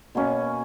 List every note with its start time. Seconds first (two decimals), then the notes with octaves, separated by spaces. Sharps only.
0.15 B2 A#3 C#4